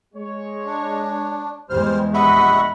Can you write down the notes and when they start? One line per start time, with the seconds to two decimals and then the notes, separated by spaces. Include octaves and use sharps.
0.14 G#3 C#5
0.65 D4
1.70 E2 G3 G#3 C5 F6
2.14 A#1 G3 D#5 E5 F#5 B5 C#6